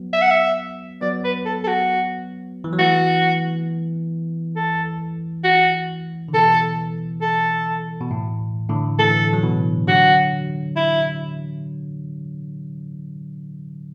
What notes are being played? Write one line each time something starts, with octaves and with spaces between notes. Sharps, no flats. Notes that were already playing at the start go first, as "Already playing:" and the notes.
Already playing: F#3 B3
E5
F#5
E5
F#3 B3 D5
B4
A4
A4
F#4
E3
F#3
E3 A3 F#4
A4
F#4
D3
B2 E3 A4
A4
B2
A2
A2 D3
E3 A3 A4
F#3
B2 E3
D3 F#3 F#4
E4